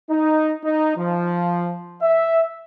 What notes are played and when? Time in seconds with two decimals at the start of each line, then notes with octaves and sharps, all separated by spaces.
0.10 D#4
0.64 D#4
0.97 F3
2.02 E5